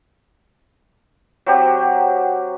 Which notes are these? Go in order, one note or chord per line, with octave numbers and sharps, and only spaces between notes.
F#3 C4 G4